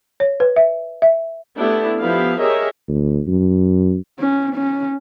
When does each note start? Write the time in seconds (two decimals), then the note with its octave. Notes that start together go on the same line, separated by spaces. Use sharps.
0.20 C#5
0.40 B4
0.56 E5
1.02 E5
1.58 A3 B3 D4 E4 G4
2.02 F3 B3 E4 G4 B4 F5
2.40 G4 G#4 A#4 C#5 D#5 E5
2.88 D2
3.27 F#2
4.20 C#4
4.56 C#4